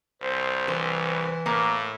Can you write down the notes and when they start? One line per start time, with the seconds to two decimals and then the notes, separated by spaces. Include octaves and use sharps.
0.22 C2 C5
0.68 E3 C5
1.46 A2 A#3